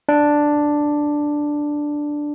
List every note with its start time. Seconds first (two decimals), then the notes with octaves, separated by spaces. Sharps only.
0.09 D4